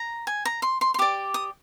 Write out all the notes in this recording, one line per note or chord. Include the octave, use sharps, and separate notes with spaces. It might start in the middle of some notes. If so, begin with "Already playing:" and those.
Already playing: A#5
G#5
A#5
C6
C6
C6
G4 D5 D6
D#6